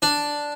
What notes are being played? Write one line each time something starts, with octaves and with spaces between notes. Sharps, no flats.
D4